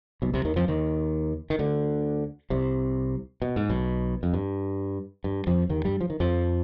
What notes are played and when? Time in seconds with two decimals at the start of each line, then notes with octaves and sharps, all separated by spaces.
0.22 B1 B2
0.34 C2 C3
0.45 D#2 D#3
0.56 F2 F3
0.68 D#2 D#3
1.50 D#3
1.59 D2 D3
2.50 C2 C3
3.42 B2
3.56 G#2
3.69 B1 B2
4.23 F2
4.34 G2
5.24 G2
5.47 F2 F3
5.69 D#2 D#3
5.85 G2 G3
6.01 F3
6.10 D#3
6.20 F2 F3